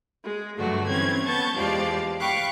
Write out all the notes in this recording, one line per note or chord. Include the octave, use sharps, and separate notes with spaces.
G#3
G2 D3 F#3 A3 F#4
E3 C4 C#4 G#6
B3 A5 C#6 G6 A6
E2 F3 G#3 G4 D5 F5
F5 G5 B5 C#6 D6 F#6